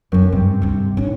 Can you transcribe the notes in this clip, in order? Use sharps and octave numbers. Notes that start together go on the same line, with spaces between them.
F#2 D#3 C#4
G2 C3
D2 G2
G#1 D3 C#4